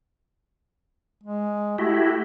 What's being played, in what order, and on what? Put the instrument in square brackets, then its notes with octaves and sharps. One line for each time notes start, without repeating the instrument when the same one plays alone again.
[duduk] G#3
[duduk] A3 [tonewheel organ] E4 F#4 G4